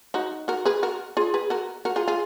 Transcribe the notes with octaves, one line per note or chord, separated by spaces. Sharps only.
D#4 F#4
F#4 A#4
G#4 B4
F#4 A#4
F4 G#4
G#4 B4
F#4 A#4
F#4 A#4
F4 G#4
F4 G#4